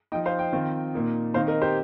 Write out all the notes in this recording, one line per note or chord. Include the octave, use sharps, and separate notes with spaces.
F3 D#4 D#5 G5
C5 F5
D#5 G5
D#3 C4 F4
A#2 A#3 D#4
D#3 C4 D#4 C5 F5
A#4 D#5
G4 C5